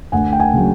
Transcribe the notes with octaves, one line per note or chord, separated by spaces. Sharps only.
D2 F#5 G#5
G5
F#5 G#5
C#3 F#3